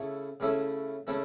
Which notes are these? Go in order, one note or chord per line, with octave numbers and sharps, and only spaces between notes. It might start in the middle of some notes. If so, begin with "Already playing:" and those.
Already playing: C#3 A3 C#4 E4
C#3 A3 C#4 E4
C#3 A3 C#4 E4